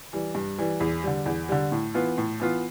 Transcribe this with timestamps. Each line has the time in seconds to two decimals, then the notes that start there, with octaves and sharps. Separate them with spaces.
0.13 E3 G3
0.35 G2
0.58 E3 G3
0.80 E2
1.04 D3 G3
1.26 E2
1.49 D3 G3
1.72 A2
1.94 E3 B3 F4
2.18 A2
2.40 E3 B3 F4